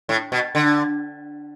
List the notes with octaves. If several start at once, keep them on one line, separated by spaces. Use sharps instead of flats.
A2
B2
D3